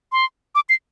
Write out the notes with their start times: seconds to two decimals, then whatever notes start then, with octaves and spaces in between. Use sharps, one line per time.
0.12 C6
0.55 D6
0.69 C7